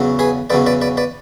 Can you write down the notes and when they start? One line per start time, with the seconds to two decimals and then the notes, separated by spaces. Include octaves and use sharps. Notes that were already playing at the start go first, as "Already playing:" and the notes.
Already playing: E2 C#3 F#3
0.19 G#4 B4
0.50 E2 C#3 F#3 B4 D5
0.66 B4 D5
0.81 B4 D5
0.97 B4 D5